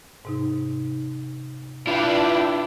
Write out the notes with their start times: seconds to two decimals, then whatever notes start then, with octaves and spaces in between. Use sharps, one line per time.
0.25 G#2 C3 D#4
1.87 D4 E4 F4 B4 G5